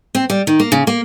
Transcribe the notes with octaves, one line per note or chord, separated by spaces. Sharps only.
C4
G3
D#3
A#3
C#3
A#3